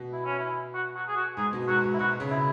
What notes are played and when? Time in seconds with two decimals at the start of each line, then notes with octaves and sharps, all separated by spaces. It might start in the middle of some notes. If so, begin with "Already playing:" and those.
Already playing: B2
0.13 E4
0.26 C#4
0.39 E4
0.75 F#4
0.96 F#4
1.08 G#4
1.17 F#4
1.37 G#2 G#4
1.53 B2
1.68 G#2 F#4
1.84 G#2
1.94 E4
1.99 B2 F#4
2.20 C#3
2.31 E4